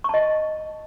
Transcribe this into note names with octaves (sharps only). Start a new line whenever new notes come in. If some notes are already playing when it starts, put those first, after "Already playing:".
D#5 A5 C#6